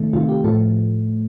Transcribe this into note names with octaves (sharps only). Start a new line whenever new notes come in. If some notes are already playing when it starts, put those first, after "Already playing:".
Already playing: C3 D#3 A3
C3 D#3 A3 F4
G4
A2 F3 A3 A4